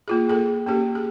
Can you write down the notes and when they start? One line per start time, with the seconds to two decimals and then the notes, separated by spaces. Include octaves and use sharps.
0.08 A#3 F4 G#4
0.29 A#3 G#4 A4
0.67 A#3 C#4 G4 A4
0.95 G#4